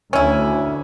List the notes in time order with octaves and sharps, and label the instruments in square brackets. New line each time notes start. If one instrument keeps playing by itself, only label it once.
[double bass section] D2 [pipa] C#4 E4